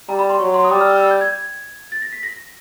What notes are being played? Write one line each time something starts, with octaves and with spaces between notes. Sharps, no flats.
G3 A#5
B5
C6
F#3 C#6
C6
D#6
G3 D6
F6
E6
E6
G6
G#6
A6
A#6
B6
A#6